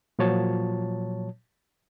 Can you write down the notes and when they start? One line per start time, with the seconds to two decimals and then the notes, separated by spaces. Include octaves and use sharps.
0.19 A#2 F3 F#3 C#5 A5